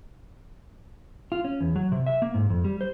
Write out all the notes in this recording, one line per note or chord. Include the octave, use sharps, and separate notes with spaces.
F4
C#4
E2
F#3
C3
E5
A#3
G#2
F2
G3
C5